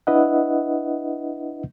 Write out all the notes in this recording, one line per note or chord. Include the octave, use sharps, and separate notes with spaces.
D4 E4 B4 D#5 E5 F#5